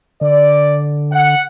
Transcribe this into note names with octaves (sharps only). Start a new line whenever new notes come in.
D3 D5
F#5